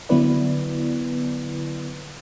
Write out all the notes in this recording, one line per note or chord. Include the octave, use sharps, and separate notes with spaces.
D3 F#3 B3 E4 B4 D5